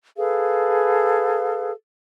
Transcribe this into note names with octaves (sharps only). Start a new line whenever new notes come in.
G#4 A4 B4 F5